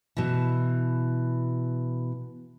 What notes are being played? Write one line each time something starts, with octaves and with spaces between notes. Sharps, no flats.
B2 E3